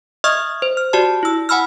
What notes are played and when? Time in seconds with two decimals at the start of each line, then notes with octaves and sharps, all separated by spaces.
0.24 D#5 E5 C#6 D#6 F6 G#6
0.62 C5
0.77 F6
0.93 F#4 G4 D5 A5
1.23 E4 E6
1.49 F#5 G#5 B5 E6 F6